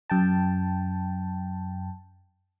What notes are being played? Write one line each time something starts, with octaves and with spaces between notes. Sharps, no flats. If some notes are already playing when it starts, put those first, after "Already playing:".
F#2 G5 A5